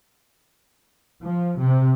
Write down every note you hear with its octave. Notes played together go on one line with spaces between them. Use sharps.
F3
C3